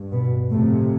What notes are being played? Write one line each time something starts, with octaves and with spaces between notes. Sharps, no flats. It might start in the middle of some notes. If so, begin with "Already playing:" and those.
Already playing: G2
B2 B3
F2 A2 C3 A3